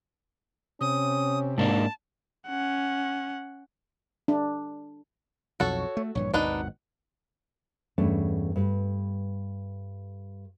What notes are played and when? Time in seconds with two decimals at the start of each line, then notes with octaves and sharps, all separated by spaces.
0.81 C3 C#4 D#6
1.58 G#2 A#3 D4 A5
2.48 C#4 F#5
4.28 D4
5.60 B1 F2 F#4 A4 C#5
5.97 A3
6.15 A#1 G2 E3 C#5
6.34 G#1 D#2 B2 D4 D#4 B4 F#5
7.98 E2 G2 A3 C#4 D4
8.56 G2 B4